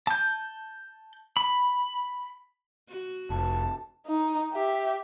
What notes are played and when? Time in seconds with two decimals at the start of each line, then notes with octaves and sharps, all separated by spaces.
0.07 A5 G6
1.37 B5
2.89 F#4
3.30 F1 A5
4.07 D#4
4.53 G4 E5